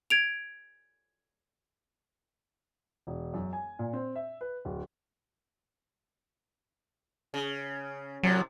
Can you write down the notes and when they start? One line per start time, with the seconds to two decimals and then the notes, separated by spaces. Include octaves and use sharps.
0.10 G#6 D7 F7
3.07 E1
3.34 F#2
3.53 G#5
3.79 A#2
3.93 C4
4.15 E5
4.41 B4
4.65 D1
7.34 C#3
8.23 A2 C3 F#3